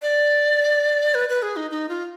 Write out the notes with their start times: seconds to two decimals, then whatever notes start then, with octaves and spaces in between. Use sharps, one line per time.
0.02 D5
1.15 B4
1.29 B4
1.42 G#4
1.56 D#4
1.71 D#4
1.89 F4